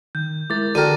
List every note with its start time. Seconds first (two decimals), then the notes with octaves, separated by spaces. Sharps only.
0.15 D#3 G6
0.50 G#3 E4 A#4 D6 A6
0.75 D3 F#4 G#4 A#4 G5 D#7